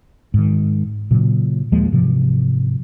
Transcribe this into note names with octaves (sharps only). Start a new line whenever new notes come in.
G#2 D#3
A#2 C#3 F#3
D#2 F3 G#3 A#3
G#2 C3 E3 F3